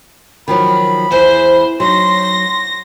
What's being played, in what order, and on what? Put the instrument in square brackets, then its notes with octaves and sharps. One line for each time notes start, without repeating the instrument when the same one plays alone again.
[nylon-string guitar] D#3 F3 F#3 [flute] B5
[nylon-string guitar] E2 [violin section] C5
[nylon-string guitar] F#3 D#4 [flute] C6 [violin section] A#6